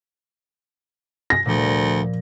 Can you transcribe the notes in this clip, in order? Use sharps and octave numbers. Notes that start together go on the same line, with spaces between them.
A#6
D2 A#2 F3 G3